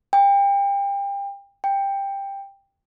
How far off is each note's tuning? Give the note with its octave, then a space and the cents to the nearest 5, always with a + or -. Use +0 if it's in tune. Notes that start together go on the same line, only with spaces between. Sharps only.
G5 +30
G5 +10